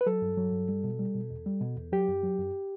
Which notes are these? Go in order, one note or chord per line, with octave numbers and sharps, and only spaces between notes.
B4
F#3 A4
G2
F#3
G2
G3
B2
G3
B2
E2
G3
B2
E2
F#3 G4
F#2
F#3
F#2